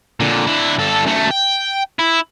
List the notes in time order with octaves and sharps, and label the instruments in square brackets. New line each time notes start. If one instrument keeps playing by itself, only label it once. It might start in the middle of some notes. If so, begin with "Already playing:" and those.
[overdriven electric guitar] A#2 D3
D3 E4
G2 A4
F#2 A3
G5
E4